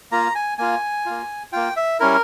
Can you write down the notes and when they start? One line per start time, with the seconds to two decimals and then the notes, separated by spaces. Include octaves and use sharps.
0.12 A#3 F4 A#5
0.35 G#5
0.58 A#3 F4 G#5
1.06 A#3 F4
1.52 A#3 F4 G5
1.76 E5
2.00 G3 C#4 E4 A#4